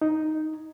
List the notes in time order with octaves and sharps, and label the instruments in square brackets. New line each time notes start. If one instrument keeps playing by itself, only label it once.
[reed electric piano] D#4